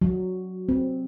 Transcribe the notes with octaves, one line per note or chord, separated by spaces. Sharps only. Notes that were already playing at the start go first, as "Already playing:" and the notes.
F#3
C4